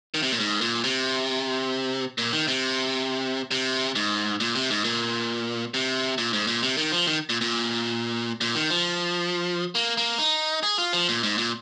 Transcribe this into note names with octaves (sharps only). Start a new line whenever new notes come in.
D#3
C3
A#2
G#2
A#2
C3
A#2
D#3
C3
C3
G#2
A#2
C3
G#2
A#2
C3
A#2
G#2
A#2
C3
D#3
F3
D#3
A#2
A#2
A#2
D#3
F3
A#3
A#3
D#4
G#4
F4
F3
A#2
G#2
A#2